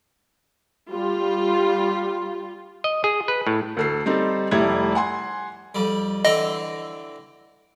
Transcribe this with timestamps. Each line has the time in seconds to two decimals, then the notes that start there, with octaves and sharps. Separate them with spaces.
0.90 G3 F4
2.84 D#5
3.04 G#4
3.28 B4
3.47 A2
3.77 D2 A4 C7
4.06 G3 C4 D#4 A4
4.51 F1 G3 A3 E4 B5 G#6
4.95 F#5 G#5 C6
5.75 F2 G3
6.25 D3 E3 C4 D#5